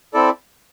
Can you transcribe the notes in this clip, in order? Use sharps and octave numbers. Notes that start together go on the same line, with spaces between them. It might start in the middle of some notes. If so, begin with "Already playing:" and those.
C4 E4 A4 D5